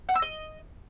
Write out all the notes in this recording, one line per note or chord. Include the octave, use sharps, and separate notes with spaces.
F#5
E6
D#5